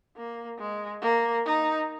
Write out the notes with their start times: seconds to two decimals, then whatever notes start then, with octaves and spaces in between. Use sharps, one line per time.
0.17 A#3
0.59 G#3
1.02 A#3
1.45 D#4